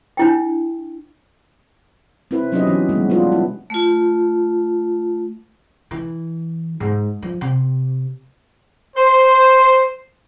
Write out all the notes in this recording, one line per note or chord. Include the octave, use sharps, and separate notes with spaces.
D4 E4 G5
C4 E4 B4
F#3 B3 C#4 D#4 G4 D#5
E3 C#4
B2 G3 G#3 B3
B3 D4 F4 B4
E4
A3 F4
E3
G#2
F3
C3
C5